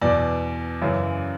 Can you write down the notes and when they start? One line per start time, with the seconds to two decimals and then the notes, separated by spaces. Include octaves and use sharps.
0.01 E2 B2 D5
0.82 F#2 C#3 E3